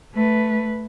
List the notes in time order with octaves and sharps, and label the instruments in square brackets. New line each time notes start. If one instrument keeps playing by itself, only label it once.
[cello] A3 B4